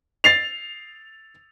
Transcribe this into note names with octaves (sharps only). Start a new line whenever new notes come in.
A6 C7 F7